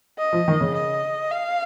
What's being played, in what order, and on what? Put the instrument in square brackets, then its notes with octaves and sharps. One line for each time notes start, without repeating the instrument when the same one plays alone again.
[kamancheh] D#5
[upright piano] F3
D#3
C#3
[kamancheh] D#5
F5